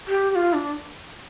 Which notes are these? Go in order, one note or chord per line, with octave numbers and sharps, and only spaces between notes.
G4
G4
F4
D4